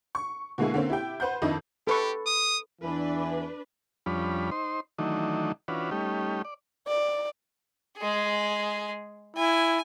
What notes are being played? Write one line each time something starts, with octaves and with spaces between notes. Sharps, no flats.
C#6
B2 D3 G#3 A#3 E4 G#4
D3 A#3 C4 C#4
E4 G4 G5
B4 C5 F#5 G6
F2 D#3 D4 E4 D#5
G4 A4 B4 C#6
D#6
E2 E3 D4 B4
F2 F3 G3 C#4 D4 B5
D#4 C5 C6
D#3 E3 F#3 A3 D4 D#4
E3 C#4 D4 F4 F#4 B4
G3 A3 C#4 D#4 G4
D5
D5
G#3 G#4
E4 G#5